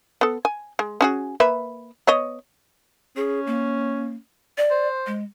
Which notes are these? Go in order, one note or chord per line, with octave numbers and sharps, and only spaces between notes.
B3 A4
G#5
G#3
C#4 F#4 G#4
A#3 B4 E5
B3 C#5 D#5
C#4 G#4
A#3
D5
C5
G#3